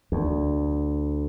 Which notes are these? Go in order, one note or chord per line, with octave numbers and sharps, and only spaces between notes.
D2